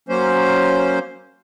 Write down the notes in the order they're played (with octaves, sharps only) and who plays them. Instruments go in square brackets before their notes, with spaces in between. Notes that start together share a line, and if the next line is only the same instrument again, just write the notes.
[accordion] F#3 A#3 C#4 C5